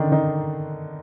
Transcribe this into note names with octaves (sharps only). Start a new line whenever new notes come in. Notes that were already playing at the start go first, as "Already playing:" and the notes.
Already playing: D3 D#3 D4 D#4
D#3 D#4